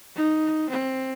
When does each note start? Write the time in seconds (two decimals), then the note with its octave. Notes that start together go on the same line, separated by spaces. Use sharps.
0.16 D#4
0.70 C4